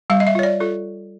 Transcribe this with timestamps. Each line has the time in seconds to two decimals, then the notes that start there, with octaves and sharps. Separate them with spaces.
0.10 G3 F5
0.20 D#5
0.27 E5
0.35 F4 C#5
0.43 D5
0.60 F4 A4